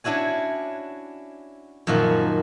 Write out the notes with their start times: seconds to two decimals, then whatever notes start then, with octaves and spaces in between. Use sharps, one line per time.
0.04 C#4 D4 E4 F#4 G#5
1.87 F#2 A#2 D#3 F3 F#4